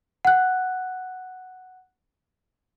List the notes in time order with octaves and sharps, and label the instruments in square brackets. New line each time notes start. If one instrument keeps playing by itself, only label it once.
[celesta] F#5 F#6